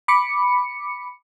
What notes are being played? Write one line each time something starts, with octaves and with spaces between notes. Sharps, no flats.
B5 D6 C#7